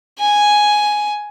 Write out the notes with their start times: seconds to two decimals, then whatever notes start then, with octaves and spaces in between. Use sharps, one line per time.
0.19 G#5